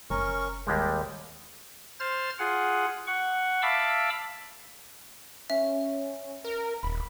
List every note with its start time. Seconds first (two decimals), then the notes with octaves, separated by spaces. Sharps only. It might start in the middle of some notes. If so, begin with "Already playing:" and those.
0.10 F#1 C#4 A#4 C#6
0.67 D#2 G3 G#3 G5
2.00 C5 F6 A6
2.39 F4 G#4 F#5
3.07 F#5 C#6
3.62 E5 F5 A5 B5 D6 E6
5.50 C#4 E5
6.45 A#4
6.83 D#1 B5